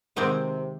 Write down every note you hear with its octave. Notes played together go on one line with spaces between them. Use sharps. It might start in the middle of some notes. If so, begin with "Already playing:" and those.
C3 D#3 G#3 C4 G4